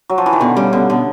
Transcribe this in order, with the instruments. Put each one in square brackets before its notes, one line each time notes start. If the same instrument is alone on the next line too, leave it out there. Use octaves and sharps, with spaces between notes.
[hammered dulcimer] F#3
F3
E3
D#3
[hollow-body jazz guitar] B2 [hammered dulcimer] D3
[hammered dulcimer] C#3 [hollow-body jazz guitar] G3
[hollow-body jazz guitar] B2 [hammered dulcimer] D3
[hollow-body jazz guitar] B2 [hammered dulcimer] D3